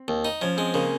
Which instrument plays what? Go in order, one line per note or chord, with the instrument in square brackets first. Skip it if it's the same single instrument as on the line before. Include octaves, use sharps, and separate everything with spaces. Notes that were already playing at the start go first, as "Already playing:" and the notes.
Already playing: [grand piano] C4
[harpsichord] D#2
D#4
[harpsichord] F3 [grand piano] C#4
[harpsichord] G#3 [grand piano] C4
[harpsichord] C#3 [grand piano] A#3